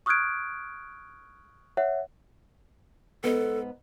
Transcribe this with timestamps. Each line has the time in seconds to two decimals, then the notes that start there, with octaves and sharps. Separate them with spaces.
0.06 C#6 D#6 F6 F#6 G#6 D7
1.77 C#5 E5 F#5
3.24 G#2 B3 A4